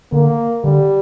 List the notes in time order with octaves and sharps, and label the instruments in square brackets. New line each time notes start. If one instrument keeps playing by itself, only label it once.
[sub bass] D3 [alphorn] A#3
[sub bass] D3 [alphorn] G3